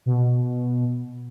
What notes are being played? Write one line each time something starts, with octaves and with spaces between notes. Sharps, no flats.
B2